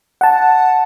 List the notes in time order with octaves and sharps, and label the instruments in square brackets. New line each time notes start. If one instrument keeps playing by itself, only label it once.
[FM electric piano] F#5 A5